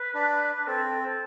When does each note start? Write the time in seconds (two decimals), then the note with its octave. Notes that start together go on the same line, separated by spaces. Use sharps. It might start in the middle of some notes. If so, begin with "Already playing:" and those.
Already playing: B4
0.14 D4
0.67 C4 A4
0.85 A4
1.03 A4